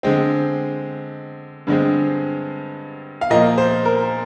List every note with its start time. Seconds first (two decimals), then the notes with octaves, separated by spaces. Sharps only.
0.03 D3 G#3 C4
1.67 G2 D3 G#3 C4
3.21 F5
3.30 A#2 F3 A#3 D#5
3.58 C5
3.85 A#4